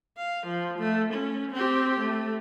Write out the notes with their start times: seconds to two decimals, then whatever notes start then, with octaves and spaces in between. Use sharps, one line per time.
0.17 F5
0.47 F3
0.79 A3
1.14 C#4
1.52 C4 G4
2.00 A3